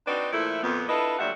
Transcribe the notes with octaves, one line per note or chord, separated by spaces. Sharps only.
C4 D4 D#4 F#4 B4 D5
A#2 F3 A3 E4
F2 A#2 B3
D4 E4 F4 A4 B4 D#5
D2 A#2 F#3 G3 E5 F#5